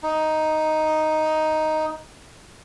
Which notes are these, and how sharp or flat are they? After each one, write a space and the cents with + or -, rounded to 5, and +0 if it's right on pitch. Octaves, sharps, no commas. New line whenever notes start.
D#4 +5